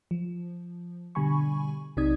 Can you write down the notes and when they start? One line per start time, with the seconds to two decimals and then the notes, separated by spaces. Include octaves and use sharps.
0.11 F3
1.15 B2 D3 G3 G#5 B5 C#6
1.97 B1 C3 D#4 D5 D#6 G#6